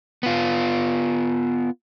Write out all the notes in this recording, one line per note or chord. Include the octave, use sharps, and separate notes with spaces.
B3 F4